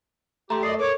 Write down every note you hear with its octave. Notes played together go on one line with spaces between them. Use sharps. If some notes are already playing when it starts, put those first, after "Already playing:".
A3 G4 A#5 C6
F#2 D5 D#5 C7
A4 A#4 C#5 D6